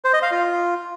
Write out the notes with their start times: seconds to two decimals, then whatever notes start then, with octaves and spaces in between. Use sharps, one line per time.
0.04 C5
0.13 D#5
0.22 F5
0.31 F4